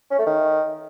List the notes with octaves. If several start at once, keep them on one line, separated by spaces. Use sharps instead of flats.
C#4
A3
D#3